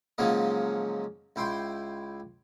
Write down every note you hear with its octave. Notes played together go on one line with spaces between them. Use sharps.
G#2 C#3 F3 F#3 A#3 D#5
C#2 E4 G5 C6